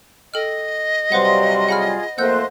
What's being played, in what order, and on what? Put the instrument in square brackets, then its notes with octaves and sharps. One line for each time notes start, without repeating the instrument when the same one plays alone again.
[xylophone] A4 G5 F6 [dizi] D#5
[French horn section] C3 F#3 G3 [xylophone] B4 C5 F#5 [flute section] F5 C6
[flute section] F4 G#4 [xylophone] F#5 B5 F6
[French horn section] F2 A3 A#3 [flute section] C5 F#6 [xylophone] F#5 E6 G6